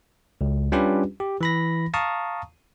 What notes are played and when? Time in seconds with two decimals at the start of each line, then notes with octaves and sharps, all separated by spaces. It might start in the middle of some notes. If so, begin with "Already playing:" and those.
0.41 C#2
0.72 G3 C#4 D4 F4 G4 B4
1.20 G4
1.41 E3 B5 A#6
1.94 F5 A5 A#5 C#6 D#6